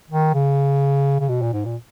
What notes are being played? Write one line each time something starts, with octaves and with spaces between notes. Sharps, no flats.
D#3
C#3
C#3
B2
A#2
G#2
A#2